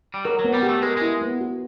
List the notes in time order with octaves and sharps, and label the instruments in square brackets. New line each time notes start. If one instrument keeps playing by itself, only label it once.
[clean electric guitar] G3
[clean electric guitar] F#3 [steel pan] A#4
[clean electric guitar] F#3
[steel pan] B3
[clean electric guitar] G3
[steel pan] G4
[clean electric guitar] A3
[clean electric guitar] G#3 [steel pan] A#4
[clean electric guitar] G#3 [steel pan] E4
[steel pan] B3
F#4